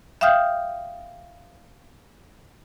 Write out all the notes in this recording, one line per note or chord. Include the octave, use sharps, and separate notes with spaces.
E5 F5 G5 D#6 F6 G6